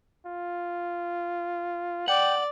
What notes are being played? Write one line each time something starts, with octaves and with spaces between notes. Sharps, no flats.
F4
D5 F#5 G5